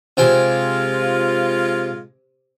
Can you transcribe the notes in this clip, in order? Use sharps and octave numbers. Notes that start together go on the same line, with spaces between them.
C3 G#3 F4 G5 G#5